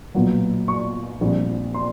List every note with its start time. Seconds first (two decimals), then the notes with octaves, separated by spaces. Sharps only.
0.14 B1 A#2 F#3 B3
0.68 C#6
1.21 A#1 A#2 G3 C4
1.74 C6